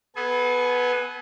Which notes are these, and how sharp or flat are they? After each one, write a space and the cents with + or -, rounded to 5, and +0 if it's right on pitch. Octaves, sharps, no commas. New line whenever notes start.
B3 +0 A4 -40 G#5 +0